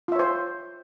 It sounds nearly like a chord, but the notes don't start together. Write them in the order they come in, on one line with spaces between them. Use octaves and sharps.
F4 E5 C#5 C5